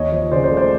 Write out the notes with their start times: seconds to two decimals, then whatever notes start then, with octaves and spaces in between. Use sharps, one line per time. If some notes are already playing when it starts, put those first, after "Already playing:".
Already playing: D#2 C#5 D#5
0.12 F3
0.31 C#3 C5 D5
0.44 C5
0.51 A3
0.57 C5 D5